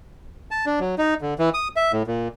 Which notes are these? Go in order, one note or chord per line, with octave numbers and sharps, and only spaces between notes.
A5
D4
F#3
D#4
D3
E3
D#6
E5
A2
A#2